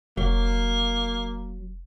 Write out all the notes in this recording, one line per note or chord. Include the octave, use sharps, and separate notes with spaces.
F1 F#3 A#3